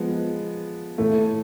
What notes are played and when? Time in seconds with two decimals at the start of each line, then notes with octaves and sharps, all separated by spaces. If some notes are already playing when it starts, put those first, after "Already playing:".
Already playing: F3 G#3 B3
0.98 A2 E3 A3